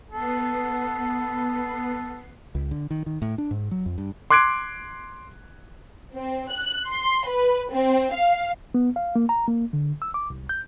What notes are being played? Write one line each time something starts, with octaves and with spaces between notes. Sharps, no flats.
B3 A4 C7
C#2
D3
D#3
D#3
A2
D4
G#2
F#3
F2
G2
C6 D6 F#6 G#6 C7 D7
C4
F#6
C6
B4
C4
F5
B3
F5
A#3
A#5
A#3
D3
E6
D6
C2
G6